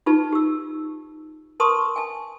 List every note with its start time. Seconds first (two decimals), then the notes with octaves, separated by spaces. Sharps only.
0.06 D#4 F4 G4 B4 A5
0.32 G4 E6
1.60 A#4 B4 A5 C6 C#6 D#6
1.96 G#5 A5